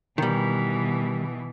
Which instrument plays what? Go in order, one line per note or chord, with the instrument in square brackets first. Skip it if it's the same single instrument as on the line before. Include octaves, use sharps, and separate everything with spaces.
[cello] B2 E3 [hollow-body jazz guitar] D#3 G3